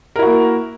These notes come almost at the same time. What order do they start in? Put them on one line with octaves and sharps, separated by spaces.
A#4 E4 F#4 A#3